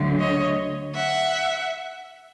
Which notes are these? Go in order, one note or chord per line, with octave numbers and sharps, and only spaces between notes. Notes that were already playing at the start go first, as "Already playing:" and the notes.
Already playing: D2 D3 F#3 A3
C#5 D#5
E5 F#5